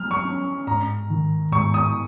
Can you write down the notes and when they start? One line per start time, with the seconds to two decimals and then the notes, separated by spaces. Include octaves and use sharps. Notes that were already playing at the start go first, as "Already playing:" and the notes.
Already playing: F#3 F6
0.11 C#6
0.25 C#4
0.67 G#2 A#5
1.10 D#3
1.52 G#2 C#6
1.74 D#6